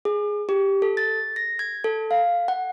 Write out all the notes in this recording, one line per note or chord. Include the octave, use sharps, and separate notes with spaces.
G#4
G4
A4
A6
A#6
G#6
A4
F5
F#5